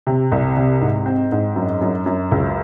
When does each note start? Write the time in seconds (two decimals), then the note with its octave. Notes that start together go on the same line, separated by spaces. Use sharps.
0.07 C3
0.32 C2
0.57 C3
0.81 G#2
1.06 C4
1.32 G#2
1.56 F#2
1.81 F#2
2.06 F#2
2.32 C#2